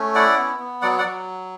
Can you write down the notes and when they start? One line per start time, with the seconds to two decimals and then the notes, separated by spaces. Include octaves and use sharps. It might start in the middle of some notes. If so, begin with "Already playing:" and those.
Already playing: A3 C#4
0.15 E4 D5 F#5
0.38 B3
0.60 B3
0.82 F#3 D5 F#5
0.99 D5 F#5
1.05 F#3